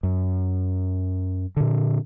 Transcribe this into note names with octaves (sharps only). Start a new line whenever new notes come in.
F#2
A#2 D3